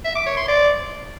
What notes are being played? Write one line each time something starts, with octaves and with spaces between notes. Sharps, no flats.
E5
D6
C#5
C6
D5